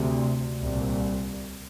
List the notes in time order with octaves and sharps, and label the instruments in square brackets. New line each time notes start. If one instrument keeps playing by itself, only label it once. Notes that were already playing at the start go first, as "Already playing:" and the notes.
Already playing: [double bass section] D2 C3
C2 A#2